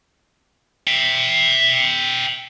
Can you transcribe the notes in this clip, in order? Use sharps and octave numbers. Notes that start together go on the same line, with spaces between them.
E5 G5